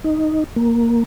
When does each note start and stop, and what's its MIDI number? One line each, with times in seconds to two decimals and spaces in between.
0.04 0.44 63
0.56 1.04 58